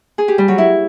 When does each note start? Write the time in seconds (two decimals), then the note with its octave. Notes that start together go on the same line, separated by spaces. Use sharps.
0.18 G#4
0.28 G4
0.38 G3
0.48 F#3
0.58 E4